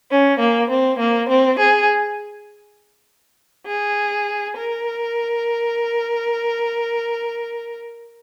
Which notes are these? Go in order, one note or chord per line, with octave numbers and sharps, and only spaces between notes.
C#4
A#3
C4
A#3
C4
G#4
G#4
A#4